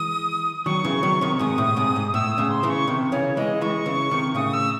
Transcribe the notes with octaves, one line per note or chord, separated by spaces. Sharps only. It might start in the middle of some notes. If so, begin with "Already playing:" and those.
Already playing: E3 G#3 D#6
D#3 F#3 C#6
C#3 E3
D#3 F#3
C3 D#3
G#2 C3 D#6
A2
G#2 C3
G#2
A2 E6
D#6
A2 C#3
C6
C#3 E3
C#6
C3 D#3
C#3 E3 C#5
E3 G#3 D#5
E3 G#3 C#6
C#3 E3
C3 D#3
A2 C#3 D#6
E6